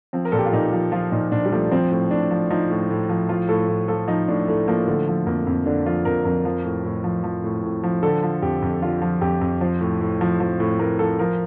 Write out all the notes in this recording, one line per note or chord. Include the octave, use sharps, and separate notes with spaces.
F3 C4
A#4
A#2 A4
G4
F4
A#2 D#4
F3
F3 F4
A#2 D#4
A#2 D4
G3
F3 A3
F3 C4
A2
A2 D4
F3
F3 D#4
A2
A2
F3
F3 F4
A2 A4
A2
F3 A4
F3 D#4
A2 D4
A2 A3
F3 A#3
D3 A3
F3
F2 A#3
F2
D3 D4
F3 F4
F2 A#4
F2 A#4
F3
A2
A2
F3
F3
A2
A2
F3
D3 A4
F3
F2 G4
F2
D3 F4
F3
F2 G4
F2
F3 C5
A2
A2
F3
F3
A2
A2 A#4
F3 A4
F3 A#4